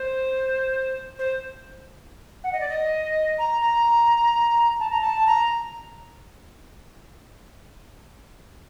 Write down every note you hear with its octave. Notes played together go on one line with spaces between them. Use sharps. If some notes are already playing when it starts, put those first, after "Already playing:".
Already playing: C5
C5
F#5
D#5
D5
D#5
A#5
A#5
A5
A#5
A5
A#5